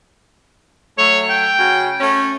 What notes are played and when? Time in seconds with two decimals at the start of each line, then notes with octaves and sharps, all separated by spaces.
0.98 F#3 A3 C#5
1.30 G5
1.58 C#3 F#4
2.00 A3 C#4